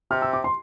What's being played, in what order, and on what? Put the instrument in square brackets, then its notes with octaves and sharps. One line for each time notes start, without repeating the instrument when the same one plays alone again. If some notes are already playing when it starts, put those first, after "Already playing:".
[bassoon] C3 [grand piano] F6
[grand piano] E6
D6
C6